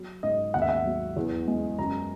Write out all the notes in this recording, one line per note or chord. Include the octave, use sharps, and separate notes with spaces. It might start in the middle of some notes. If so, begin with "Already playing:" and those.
Already playing: F#3
G#2 D#5
D#2 F#5
E5
F#5
F#3
E2
G#3
F#2 A#5